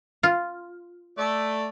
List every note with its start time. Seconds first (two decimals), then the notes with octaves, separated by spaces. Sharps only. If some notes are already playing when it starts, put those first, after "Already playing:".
0.23 F4
1.18 A3 D5